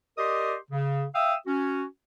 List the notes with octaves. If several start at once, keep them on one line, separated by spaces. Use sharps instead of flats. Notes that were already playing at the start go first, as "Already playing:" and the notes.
G4 A#4 D5 D#5 C6 D#6
C#3
E5 F5 G5 D#6 E6
C#4 F#4